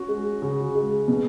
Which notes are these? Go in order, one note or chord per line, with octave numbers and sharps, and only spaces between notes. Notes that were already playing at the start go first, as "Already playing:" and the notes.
Already playing: C#4 F#4
G#3
C#3 F#4
G#3
B2